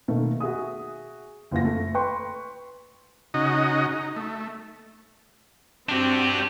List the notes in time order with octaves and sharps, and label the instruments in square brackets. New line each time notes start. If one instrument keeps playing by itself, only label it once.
[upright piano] B2 D#3 A3 A#3
F#4 G#4 E5 D#6
F#1 E2 F4 A#6
A3
B4 G5 C6 C#6
[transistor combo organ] C#3 D#4 F#4 D#5
D#4
A3
[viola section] C4 F#4 [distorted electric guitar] D4 G4